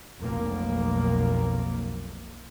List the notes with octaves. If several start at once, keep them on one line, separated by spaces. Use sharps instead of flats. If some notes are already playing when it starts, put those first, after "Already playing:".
F1 B1 A#3